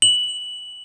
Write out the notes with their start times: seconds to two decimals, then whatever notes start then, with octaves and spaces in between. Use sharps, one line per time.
0.02 F#7